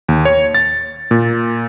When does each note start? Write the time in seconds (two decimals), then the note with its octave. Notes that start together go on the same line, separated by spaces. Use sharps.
0.08 D#2
0.25 C#5
0.54 A6
1.11 A#2